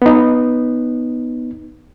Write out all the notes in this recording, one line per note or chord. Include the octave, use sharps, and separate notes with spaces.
B3 D#4